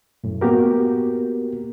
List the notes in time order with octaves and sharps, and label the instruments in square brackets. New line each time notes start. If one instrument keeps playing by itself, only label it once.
[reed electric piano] F#2 A2
A#3 B3 F#4 G4 A#4